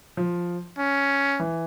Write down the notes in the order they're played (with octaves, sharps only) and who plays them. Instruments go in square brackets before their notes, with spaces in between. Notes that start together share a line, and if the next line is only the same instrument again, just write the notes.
[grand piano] F3
[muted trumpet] C#4
[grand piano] E3